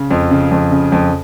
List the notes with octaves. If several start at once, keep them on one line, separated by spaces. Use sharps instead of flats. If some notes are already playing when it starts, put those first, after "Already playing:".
Already playing: C#3
F2
C#3
F2
C#3
F2